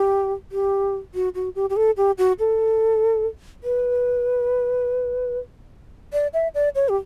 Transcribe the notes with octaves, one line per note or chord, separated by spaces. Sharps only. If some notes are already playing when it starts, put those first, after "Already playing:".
Already playing: G4
G4
F#4
F#4
G4
G4
A4
G4
F#4
A4
B4
D5
E5
D5
C#5
G4